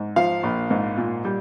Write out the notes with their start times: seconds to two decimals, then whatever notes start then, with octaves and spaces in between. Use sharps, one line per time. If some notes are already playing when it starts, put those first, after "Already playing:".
Already playing: G#2
0.16 F3 F5
0.43 A#1
0.70 G#2
0.97 A#2
1.25 G3